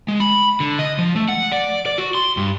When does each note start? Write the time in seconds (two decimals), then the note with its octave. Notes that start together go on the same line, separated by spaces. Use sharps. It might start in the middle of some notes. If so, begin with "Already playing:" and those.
0.08 G#3
0.20 B5
0.60 D3
0.79 D#5
0.99 F3
1.16 A3
1.28 F#5
1.52 D5
1.86 D5
1.98 F#4
2.15 C6
2.37 G2